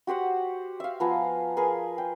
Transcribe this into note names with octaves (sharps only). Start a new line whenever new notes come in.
F#4 G4 C5 F#5
E5 F5
F3 B3 G#5 A#5
G#4 A#4 B4
G5